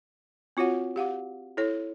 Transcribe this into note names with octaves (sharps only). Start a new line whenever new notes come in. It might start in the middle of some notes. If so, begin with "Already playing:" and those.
C4 F4 F#4 C#5 F#5
G4 F5 F#5 D6
E4 A4 C#5